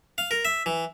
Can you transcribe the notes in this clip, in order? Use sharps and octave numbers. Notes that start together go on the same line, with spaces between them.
F5
A#4
E5
E3